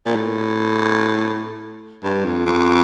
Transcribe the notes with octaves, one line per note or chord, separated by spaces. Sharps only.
A#2
A2
G2
F2
F2